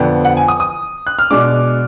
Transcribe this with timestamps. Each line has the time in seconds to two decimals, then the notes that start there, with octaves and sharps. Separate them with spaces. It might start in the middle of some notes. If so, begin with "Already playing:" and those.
Already playing: F2 D3 F3 B3
0.25 F#5
0.37 G#5
0.48 D#6
0.60 D#6
1.07 F#6
1.19 F6
1.30 B2 G#3 D4 D6